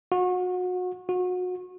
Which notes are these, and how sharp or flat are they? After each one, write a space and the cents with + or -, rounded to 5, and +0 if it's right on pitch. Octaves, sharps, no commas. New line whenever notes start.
F#4 -30
F#4 -30